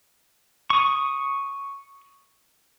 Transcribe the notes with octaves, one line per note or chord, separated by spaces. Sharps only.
C#6 D#6